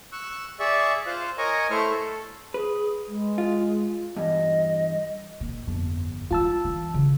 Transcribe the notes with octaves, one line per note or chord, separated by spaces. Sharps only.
C#6 E6 F#6
G#4 D5 E5 C#6
F4 C5 F5 F#6
A#4 C#5 D#5 G#5 A#5 C#6
A3 E4 C5 C#6 F6
A4
G#4 B4
G#3
F4
E2 G2 D#5
A#2
G1 F2
F#3 G3 F4 A5 E6
E3
C#3